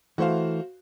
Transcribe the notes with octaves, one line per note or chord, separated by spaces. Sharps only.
E3 A3 F#4 C5 F5